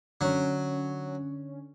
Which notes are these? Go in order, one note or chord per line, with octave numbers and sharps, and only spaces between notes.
D3 F#3 C#4